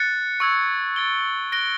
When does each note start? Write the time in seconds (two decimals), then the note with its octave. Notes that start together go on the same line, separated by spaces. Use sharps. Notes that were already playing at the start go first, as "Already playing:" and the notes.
Already playing: F#6 A6 C#7
0.40 C#6 E6 G#6
0.96 A6 D7 G7
1.52 F#6 A#6 D7 G7